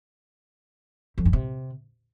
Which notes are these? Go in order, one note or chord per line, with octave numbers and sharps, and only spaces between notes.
F2
G2
C3